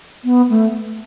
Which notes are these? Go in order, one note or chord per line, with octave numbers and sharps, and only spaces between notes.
B3
A3